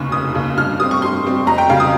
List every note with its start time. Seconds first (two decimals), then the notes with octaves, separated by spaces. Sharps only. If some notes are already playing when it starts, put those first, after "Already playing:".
Already playing: F1 D#2 C#3 C#6
0.12 F1 D#6
0.35 D#2 C#3
0.57 G2 F6
0.79 G3 C4 D#6
0.91 C#6
1.02 G2 C6
1.25 G3 C4
1.47 F2 A#5
1.58 G5
1.69 C#3 G3 F5
1.80 D#6